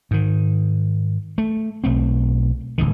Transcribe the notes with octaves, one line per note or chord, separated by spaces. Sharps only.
G#2 D#3
A3
B1 A3 C4
D#1 C#2 G#2 D#3